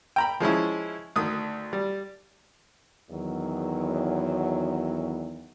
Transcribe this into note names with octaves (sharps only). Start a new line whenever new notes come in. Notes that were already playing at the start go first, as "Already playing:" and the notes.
G5 A#5 B5
F3 G#3 C#4 E4
D2 D#3 D#6
G3
E2 D#3 F#3